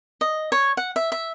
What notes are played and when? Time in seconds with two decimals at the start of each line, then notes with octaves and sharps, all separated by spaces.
0.21 D#5
0.52 C#5
0.77 F#5
0.96 E5
1.12 E5